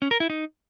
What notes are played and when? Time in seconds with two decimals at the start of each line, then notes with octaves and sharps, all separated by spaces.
0.02 C#4
0.11 A#4
0.20 E4
0.30 D#4